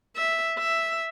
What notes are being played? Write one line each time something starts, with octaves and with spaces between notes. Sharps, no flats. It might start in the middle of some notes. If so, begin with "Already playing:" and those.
E5
E5